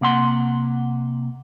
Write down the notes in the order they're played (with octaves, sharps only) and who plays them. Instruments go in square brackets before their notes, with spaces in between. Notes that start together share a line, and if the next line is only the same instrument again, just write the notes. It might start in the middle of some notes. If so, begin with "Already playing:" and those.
[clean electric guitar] C3 A#3 F#5 C6